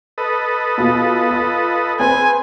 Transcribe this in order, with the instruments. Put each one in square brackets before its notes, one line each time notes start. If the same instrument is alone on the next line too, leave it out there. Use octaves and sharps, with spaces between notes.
[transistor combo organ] A4 B4 D#5
[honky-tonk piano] B2 F4 G#4
F4
[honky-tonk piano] C4 G#4 B4 [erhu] G#5